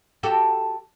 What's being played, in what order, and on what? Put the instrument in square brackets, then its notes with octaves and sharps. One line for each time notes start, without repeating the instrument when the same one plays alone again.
[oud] F#4 G4 A4